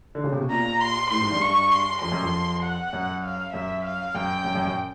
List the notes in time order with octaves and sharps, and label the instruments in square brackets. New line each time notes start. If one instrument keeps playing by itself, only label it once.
[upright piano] D3
C#3
C3
B2
[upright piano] A#2 [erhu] A#5
[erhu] C6
[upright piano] A2 [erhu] C6
[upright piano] G#2
G2
[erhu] C#6
C6
[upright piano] F2 [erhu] C6
[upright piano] F#2
F2
[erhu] F#5
[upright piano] F#2
[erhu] F5
[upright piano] F#2 [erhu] E5
[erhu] F5
[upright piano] F#2 [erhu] G5
[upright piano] F#2
F#2
F#2